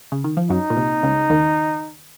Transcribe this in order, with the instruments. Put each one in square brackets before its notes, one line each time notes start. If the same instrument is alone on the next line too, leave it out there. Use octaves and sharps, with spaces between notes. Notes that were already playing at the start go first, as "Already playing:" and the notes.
[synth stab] C#3
D#3
F3
[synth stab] F#2 F#3 [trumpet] D#4
[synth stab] A#2
C2 C3
C#2 C#3
D#2 D#3